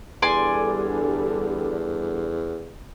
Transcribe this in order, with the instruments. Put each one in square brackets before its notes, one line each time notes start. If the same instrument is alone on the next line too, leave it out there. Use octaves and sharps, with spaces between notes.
[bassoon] E2 [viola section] D3 G3 D4 [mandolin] D5 G#5 C6